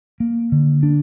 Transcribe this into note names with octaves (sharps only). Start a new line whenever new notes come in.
A#3
D3
D4